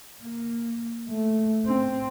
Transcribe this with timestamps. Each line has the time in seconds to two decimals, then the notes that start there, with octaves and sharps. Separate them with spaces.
0.21 A#3
1.09 A3
1.66 C4